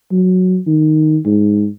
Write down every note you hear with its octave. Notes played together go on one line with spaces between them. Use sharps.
F#3
D#3
G#2